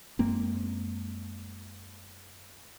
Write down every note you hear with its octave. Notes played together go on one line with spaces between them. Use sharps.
F#2 G#3 A#3 C4